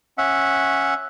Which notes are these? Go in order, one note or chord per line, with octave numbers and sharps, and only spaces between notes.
C#4 E5 F#5